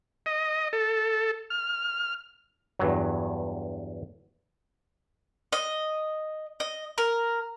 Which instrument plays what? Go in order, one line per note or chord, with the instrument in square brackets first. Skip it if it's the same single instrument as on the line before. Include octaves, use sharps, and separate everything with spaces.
[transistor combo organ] D#5
A4
F6
[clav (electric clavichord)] E2 G2 F#3
[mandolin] D#5
D#5
A#4